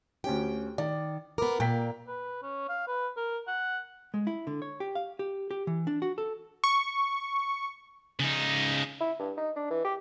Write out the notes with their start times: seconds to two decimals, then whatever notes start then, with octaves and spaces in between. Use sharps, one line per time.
0.24 D2 C#4 G4 G5
0.78 D#3 D5 D6
1.38 B3 A#4 B5 D6
1.60 A#2 A#3 G5 B6
2.08 B4
2.42 C#4
2.69 F5
2.88 B4
3.17 A#4
3.47 F#5
4.14 G#3
4.27 E4
4.47 D3
4.62 C#5
4.80 G4
4.95 F5
5.19 G4
5.51 G4
5.67 E3
5.87 D4
6.02 F#4
6.18 A4
6.64 C#6
8.20 C#3 D#4
9.01 E4
9.19 G2
9.37 D#4
9.56 D4
9.71 E3
9.85 G4